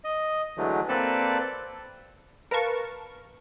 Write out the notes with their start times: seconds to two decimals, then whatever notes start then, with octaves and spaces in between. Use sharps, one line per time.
0.04 D#5
0.58 D3 E3 F#3 G#3 A3
0.89 A#3 C4 A4 B4 D5 A5
2.51 A#4 B4 F5 A5 C#6